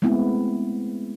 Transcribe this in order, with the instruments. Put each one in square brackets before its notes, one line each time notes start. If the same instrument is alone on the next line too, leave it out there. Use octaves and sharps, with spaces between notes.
[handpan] G#3 A3 B3 C4 E4